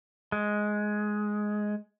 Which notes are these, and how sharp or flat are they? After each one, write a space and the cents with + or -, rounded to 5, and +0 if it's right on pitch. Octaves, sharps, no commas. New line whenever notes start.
G#3 +10